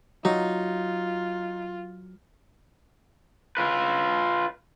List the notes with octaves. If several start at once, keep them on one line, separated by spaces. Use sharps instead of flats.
F#3 D#4 F4
F4 B4